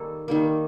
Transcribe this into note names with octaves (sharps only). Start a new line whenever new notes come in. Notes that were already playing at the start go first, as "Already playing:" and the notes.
Already playing: D#3 G3 A#3 A4
D#3 G3 A#3